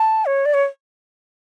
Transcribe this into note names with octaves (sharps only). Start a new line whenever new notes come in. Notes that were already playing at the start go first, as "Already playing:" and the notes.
Already playing: A5
C#5
D5
C#5